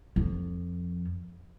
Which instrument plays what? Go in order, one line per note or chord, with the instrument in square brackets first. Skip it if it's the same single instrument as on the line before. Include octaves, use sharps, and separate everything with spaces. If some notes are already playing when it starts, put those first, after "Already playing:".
[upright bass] F2